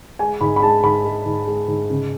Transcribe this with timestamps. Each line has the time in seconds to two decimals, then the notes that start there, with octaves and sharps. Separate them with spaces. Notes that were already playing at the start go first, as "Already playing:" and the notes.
0.19 G#3 G#5
0.41 G#2 B5
0.56 B5
0.62 G#3 A5
0.83 G#2 B5
1.05 G#3
1.26 G#2
1.47 G#3
1.68 G#2
1.90 C#3